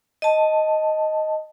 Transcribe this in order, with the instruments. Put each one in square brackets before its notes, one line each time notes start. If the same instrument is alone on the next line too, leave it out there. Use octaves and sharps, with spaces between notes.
[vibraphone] D#5 A5